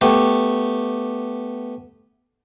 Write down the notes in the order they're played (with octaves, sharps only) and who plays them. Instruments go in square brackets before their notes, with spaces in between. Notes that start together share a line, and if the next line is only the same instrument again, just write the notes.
[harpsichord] A3 B3 G4